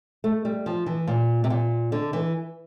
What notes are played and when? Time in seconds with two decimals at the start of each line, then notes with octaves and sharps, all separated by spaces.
0.24 A3
0.45 G3
0.66 F3
0.86 E3
1.07 A#2
1.44 C3
1.50 A#2
1.92 D3
2.13 E3